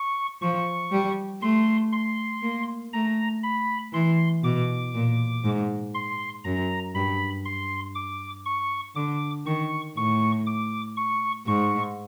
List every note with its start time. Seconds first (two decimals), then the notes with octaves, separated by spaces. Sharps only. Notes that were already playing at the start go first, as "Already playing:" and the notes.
Already playing: C#6
0.42 F3 C#6
0.92 G3
1.42 A3 C6
1.92 C6
2.42 A#3
2.93 A3 A#5
3.43 B5
3.93 E3 C6
4.43 B2 D6
4.94 A#2
5.44 G#2
5.94 C6
6.44 F#2 A#5
6.95 G2 B5
7.45 C6
7.95 D6
8.45 C#6
8.95 D3 D6
9.45 D#3 C#6
9.96 A2 C#6
10.46 D6
10.97 C#6
11.47 G#2 C#6